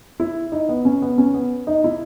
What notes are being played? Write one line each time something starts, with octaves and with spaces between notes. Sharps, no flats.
E4
D#4
B3
C#4
B3
C#4
B3
D#4
E4